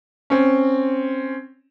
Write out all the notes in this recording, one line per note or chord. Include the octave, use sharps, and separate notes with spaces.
C4 C#4